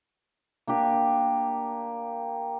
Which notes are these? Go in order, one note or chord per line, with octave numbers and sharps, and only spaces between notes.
A#3 D4 G4